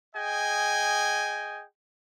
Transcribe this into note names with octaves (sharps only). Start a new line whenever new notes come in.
G#4 D#5 G5 G#5